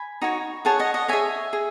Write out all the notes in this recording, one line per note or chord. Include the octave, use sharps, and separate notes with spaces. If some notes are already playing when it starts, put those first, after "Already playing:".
Already playing: G#5 B5
D#4 F#4 C#5
G#4 C#5 F#5 A5
D#5 F#5
D#5 F#5
G#4 C#5 E5 G#5
G#4